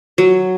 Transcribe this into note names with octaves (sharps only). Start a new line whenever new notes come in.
F#3